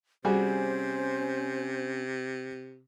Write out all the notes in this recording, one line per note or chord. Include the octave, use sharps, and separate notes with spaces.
C3 G3 C#4 F#4 G#4 C5